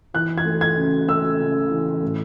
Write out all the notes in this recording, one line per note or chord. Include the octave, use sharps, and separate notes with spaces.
E3 F#6
G#6
A3
G#6
C#3
A3 E6
C#3
E3
A2